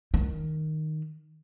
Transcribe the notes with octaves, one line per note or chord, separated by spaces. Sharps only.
D#3